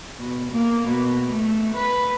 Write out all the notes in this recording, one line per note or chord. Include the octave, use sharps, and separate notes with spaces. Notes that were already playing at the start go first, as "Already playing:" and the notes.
B2
A#3
B2
A3
B4